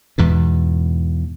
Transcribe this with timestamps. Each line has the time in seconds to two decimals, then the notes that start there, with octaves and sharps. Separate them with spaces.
0.18 E2 G#2 B2